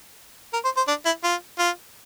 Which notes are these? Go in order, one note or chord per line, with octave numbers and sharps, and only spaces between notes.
A#4
C5
C5
D4
E4
F4
F4